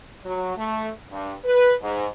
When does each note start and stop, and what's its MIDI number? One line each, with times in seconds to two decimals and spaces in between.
0.24 0.54 54
0.56 0.89 57
1.11 1.33 43
1.44 1.74 71
1.81 2.06 44